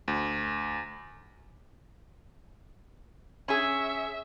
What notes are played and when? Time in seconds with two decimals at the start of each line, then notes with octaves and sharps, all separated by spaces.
0.08 D2
3.48 C#4 G#4 E5